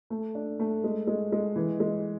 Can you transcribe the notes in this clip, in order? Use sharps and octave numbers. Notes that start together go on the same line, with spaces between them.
A3
D4
A3
G#3
G#3
G#3
E3
G#3